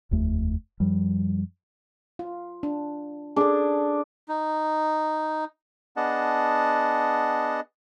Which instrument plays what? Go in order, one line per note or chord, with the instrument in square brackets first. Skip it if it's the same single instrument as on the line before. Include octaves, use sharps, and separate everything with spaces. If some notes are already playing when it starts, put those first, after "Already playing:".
[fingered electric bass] F1 D#2 A3
F#2 F3 G3
[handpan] F4
D4
[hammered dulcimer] D4 [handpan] G#4 A4
[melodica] D#4
[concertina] B3 D4 G#4 D#5 F#5 A5